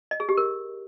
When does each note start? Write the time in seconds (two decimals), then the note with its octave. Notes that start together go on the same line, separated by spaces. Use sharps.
0.11 D#5
0.20 G#4
0.29 G4
0.37 A#4